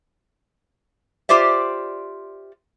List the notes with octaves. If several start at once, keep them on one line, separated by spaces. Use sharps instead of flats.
F4 G4 C5 D5 E5